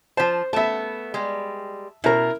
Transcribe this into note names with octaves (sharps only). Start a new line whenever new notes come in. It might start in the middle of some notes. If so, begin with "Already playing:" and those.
F3 C5 A5
A3 B3 E5 A5
G3 G#3
B2 E4 A#4 A#5